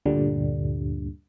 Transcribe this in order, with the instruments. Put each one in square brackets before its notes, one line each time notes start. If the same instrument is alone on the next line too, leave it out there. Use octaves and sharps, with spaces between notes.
[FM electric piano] D2 G2 A#2 D3 G3